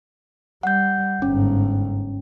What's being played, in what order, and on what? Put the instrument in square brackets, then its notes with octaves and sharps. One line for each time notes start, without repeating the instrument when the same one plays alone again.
[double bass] G3 [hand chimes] F#5 G6
[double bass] G1 G#2 [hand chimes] C#4